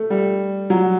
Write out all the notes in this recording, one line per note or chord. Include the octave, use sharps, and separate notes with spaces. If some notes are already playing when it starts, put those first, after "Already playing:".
Already playing: A3
G3
F#3